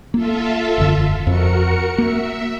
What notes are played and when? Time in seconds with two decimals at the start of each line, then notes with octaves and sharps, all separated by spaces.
0.14 A#3 F4 A4 E5
0.78 E1 F#2 D3
1.27 F2 F#4 A#4 C#7
1.98 A#3 E5